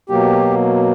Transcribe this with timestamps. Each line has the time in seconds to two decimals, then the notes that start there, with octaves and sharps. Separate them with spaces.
0.09 B2 F#3 A#3 G4